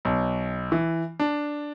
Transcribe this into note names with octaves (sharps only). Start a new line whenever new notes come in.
B1
E3
D4